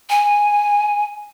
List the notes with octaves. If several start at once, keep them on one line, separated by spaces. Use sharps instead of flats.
G#5